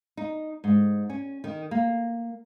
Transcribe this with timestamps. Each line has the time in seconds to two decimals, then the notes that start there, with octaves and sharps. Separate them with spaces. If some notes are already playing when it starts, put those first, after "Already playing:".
0.17 D#4
0.64 G#2
1.10 C#4
1.44 D#3
1.71 A#3